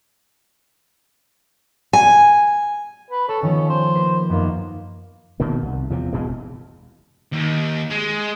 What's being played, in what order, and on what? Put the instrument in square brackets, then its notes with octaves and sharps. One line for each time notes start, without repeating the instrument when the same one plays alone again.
[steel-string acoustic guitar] G#5
[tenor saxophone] B4
[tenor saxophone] A4 [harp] C#5
[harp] D#3 F3 B3 [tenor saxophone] C#4
[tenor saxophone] C5
[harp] A#3 B4 C6
[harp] F#2 B3 D#4 [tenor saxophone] A#3
[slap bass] B2 D#3 A#3
C2
E2 C3 F3
F#1 B2 E3 G#3
[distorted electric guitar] D#2
G#3